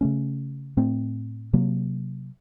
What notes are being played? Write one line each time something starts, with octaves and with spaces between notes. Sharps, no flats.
C#3 A3 C#4
A2 A3 C4
C3 F#3 A#3